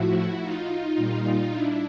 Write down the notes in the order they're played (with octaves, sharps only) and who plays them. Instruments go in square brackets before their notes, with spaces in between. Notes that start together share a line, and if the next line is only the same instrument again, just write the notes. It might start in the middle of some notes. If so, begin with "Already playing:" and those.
Already playing: [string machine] A2 F3 E4 F#4
D#4 F4
A#2 G3
D4 E4